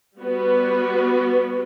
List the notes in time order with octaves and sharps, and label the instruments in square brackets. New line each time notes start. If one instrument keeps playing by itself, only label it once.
[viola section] G3 B3 F#4 B4